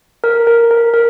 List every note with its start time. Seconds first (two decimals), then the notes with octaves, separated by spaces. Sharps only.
0.24 A#4
0.47 A#4
0.71 A#4
0.94 A#4